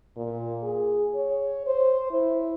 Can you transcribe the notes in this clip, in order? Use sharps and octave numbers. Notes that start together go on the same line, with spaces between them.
A#2
G#4
C#5
C5
E4